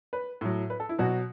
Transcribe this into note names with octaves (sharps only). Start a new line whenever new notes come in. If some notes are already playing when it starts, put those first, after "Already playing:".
B4
A2 F#3
B4
A4
E4
B2 F#3 F#4